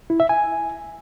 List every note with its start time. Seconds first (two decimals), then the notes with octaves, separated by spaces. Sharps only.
0.10 E4
0.20 E5
0.29 G#5